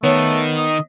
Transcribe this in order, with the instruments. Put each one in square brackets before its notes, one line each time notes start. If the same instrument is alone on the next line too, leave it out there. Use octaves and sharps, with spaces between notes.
[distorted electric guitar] D#3 D#4 [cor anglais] A3 [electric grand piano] B3 [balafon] C#5
[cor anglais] D#5